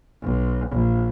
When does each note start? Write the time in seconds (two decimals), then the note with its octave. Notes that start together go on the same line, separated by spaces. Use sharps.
0.22 B1
0.70 A#1